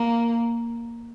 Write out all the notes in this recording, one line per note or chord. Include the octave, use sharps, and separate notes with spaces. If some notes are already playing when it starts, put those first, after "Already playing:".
Already playing: A#3